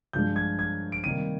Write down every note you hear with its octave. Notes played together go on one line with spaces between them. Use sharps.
G2 F3 G#3 G6
G#6
G#6
D7
C3 D#3 G3 A#3 D#7